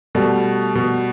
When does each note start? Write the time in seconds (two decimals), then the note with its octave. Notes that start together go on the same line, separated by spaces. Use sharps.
0.15 B2 G3 A3
0.75 B2